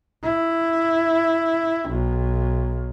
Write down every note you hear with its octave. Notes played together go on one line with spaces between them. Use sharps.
E4
B1